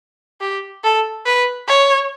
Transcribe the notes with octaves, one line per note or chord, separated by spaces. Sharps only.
G4
A4
B4
C#5